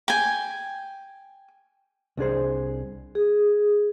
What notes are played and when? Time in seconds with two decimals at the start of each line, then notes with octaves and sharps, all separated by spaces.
0.08 G5 G#5
2.17 C2 D4 G#4 C5
3.15 G#4